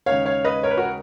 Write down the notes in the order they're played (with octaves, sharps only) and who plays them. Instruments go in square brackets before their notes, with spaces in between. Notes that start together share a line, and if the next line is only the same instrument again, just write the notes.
[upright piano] D#2 C#3 G#3 C#5 F5
C#5 F5
B4 D#5
A#4 C#5
B4
F#4 A#4